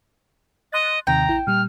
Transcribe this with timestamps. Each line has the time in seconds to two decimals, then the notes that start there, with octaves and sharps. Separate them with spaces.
0.72 D#5 C6 F#6 A6
1.07 D#2 C3 D#3 G5 A#5
1.28 A1 E4 G6
1.47 A#2 G3 F6